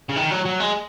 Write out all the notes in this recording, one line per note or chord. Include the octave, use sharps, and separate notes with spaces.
C#3
D#3
F#3
F#3
G#3